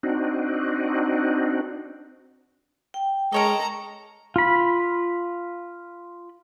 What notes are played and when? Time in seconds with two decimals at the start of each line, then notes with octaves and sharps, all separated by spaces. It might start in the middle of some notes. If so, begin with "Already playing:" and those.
0.03 C4 D4 D#4 F#4
2.94 G5
3.32 G#3 A4 A#4 C#5 D#5 A#5
4.36 F4 B5